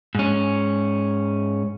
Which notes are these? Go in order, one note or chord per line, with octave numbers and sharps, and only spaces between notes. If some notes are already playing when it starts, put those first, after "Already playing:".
G#2 C#4